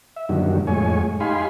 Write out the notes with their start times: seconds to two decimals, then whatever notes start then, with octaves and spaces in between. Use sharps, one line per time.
0.16 E5
0.29 F#2 A#2 D3 D#3 F#3 G3
0.67 F2 A2 G#3 C#5 G#5
1.20 D#4 G4 F5 G#5 B5 C6